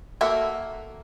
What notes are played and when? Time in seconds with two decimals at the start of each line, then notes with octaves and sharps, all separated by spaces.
0.21 A#3 F#4 A4 A#4 E5